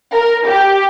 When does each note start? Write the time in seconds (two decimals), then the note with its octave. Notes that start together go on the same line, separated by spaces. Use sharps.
0.14 A#4
0.46 G4